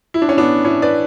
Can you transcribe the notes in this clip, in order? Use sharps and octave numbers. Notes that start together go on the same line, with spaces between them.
E4
D4
C#4
B3 D4
C#4 E4
B4 D5